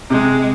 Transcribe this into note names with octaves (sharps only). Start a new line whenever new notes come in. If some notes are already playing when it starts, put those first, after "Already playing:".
C3 G#3